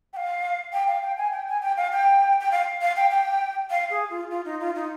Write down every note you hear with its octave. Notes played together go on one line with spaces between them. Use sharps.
G5
F5
G5
F5
G5
G#5
G5
G#5
G5
F5
G5
G5
F5
F5
G5
G5
F5
G#4
F4
F4
D#4
F4
D#4